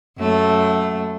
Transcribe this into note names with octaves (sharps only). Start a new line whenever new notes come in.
F#2 A3